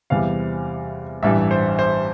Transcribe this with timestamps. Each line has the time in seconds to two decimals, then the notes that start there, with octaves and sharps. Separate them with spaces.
0.10 E2 C3 E3 G3 F5
1.23 A1 G2 E3 G3 E5
1.51 C5
1.79 C5